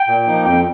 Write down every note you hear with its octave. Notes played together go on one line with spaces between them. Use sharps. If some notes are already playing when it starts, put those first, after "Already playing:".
Already playing: G5
A#2
F3 A#3 D#4
F2 G5